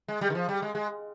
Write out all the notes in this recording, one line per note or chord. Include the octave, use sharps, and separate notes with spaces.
G#3
G3
D#3
F3
G3
G#3
G#3